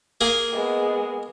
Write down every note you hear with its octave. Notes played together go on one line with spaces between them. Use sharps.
A#3 G#4
G#3 B3